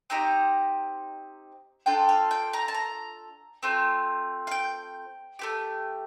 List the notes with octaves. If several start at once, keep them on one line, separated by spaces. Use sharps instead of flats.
C4 D#4 G4 A#5
D4 F4 A4 G5
F5
G5
A#5
A5
A#5
A3 C4 F4
F5
G5
A3 C4 G4